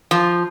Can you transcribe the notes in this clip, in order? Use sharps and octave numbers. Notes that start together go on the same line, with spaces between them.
F3